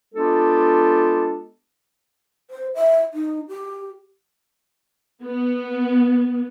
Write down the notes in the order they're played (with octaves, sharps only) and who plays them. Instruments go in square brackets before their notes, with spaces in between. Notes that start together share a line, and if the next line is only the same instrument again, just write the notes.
[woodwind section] G#3 B3 D4 F4 G4 A4
[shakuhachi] C5
E5
D#4
G4
[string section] B3